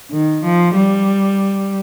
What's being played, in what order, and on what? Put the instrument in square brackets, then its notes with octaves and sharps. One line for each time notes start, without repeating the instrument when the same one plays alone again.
[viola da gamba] D#3
F3
G3